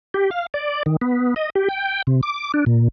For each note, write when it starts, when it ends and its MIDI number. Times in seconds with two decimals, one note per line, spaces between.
0.14 0.30 67
0.31 0.46 77
0.54 0.83 74
0.86 0.96 51
1.01 1.34 59
1.36 1.50 75
1.55 1.68 67
1.69 2.02 79
2.07 2.21 48
2.23 2.52 86
2.54 2.64 62
2.66 2.88 46